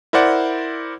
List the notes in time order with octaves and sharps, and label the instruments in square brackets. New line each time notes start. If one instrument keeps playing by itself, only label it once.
[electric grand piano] E4 A#4 C5 D5 F#5